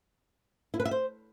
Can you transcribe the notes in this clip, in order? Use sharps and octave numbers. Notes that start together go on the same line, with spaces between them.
E4
B4
E5
C5